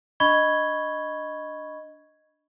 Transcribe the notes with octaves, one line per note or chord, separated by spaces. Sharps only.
D4 D#5 B5 C#6 G#6 G7